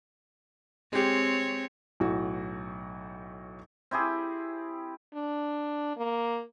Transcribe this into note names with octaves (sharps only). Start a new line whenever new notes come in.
G#3 C4 G4 C#5
B1 A2 F#4
C4 E4 G4 G#4
D4
A#3